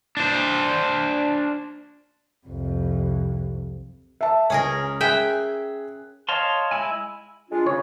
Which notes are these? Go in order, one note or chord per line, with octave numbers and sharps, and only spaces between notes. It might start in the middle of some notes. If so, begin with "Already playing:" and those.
D4 C5
C2 F2
E5 A5
C#2 C#4 G#4 A#4
G#4 E5 G5 G#5 F#6
C#5 D#5 F5 A5 C6
G#3 E4 G#5
G#3 D4 F4
C#3 C#5